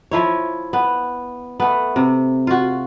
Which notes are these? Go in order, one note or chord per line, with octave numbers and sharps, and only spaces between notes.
F3 E4 C#5
B3
A3 B3
C3
F4 F#4